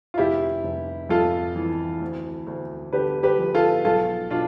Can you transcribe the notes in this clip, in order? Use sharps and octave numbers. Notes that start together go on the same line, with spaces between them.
F4
F1 E4 G4
F1
F2 F4 A4
E3
D2
D2
D3 G4 B4
G4 B4
F3
F4 A4
B1 F4 A4
B2 D4 F4